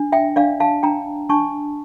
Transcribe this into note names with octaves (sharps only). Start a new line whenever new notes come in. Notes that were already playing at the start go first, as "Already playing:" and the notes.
Already playing: D4
E5 G5
D4 D5 F5
F5 A5
D4 G5 A#5
D4 A5 C#6